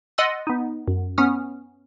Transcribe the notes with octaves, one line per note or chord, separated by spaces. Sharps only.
D#5 F#5 C6 E6 F#6 A6
B3 D#4
F#2
B3 C#4 D#6 F6